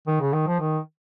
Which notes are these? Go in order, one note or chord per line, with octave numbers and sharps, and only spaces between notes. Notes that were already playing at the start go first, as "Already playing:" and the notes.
D#3
C#3
D#3
F3
D#3